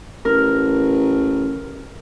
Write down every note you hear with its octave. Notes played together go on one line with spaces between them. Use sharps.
A1 A#4